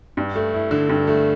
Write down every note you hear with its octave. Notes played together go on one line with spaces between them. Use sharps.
G2
A3
E4
D3
G2
A3